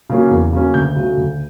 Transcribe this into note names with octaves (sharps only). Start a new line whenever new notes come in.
C#3 F#3 A#3 C#4
E2
C#3 F#3 A#3 C#4
D2 G6
C#3 F#3 A3
D2